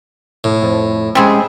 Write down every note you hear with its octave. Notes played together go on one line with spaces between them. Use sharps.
A2
F2
G3 G#3 C4 C#4 G#4